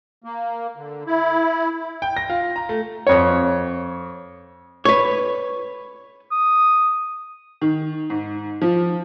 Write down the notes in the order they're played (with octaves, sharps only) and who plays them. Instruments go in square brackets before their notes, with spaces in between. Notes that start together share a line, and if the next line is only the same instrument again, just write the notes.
[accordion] A#3
D3
E4
[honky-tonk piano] G5
A#6
F4
A#5
A3
[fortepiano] F2 C#5
[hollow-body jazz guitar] B4 C#5
[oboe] D#6
[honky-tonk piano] D#3
G#2
F3